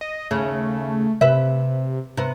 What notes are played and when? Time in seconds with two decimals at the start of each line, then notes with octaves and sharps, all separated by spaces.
0.01 D#5
0.31 D#2 C#3 A3
1.21 C3 B4 E5
2.17 C3 B3